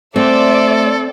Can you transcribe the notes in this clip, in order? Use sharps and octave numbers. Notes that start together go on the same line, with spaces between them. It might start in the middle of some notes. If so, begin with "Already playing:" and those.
A3 C4 A4 C5 D5 E5